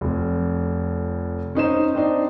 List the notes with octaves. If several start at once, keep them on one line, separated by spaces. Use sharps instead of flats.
F1 F2
C#4 D#4 C5 E7
C4 D4 D#4